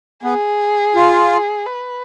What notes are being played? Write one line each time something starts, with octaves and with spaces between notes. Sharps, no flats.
B3 G#4
F4
B4